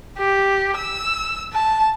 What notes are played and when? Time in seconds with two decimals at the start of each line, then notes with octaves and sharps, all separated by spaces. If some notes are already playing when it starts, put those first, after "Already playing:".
0.18 G4
0.77 E6
1.53 A5